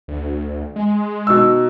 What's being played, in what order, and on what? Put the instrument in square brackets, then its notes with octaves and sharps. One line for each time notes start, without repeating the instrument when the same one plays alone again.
[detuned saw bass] D2
G#3
[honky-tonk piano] B2 D#4 E6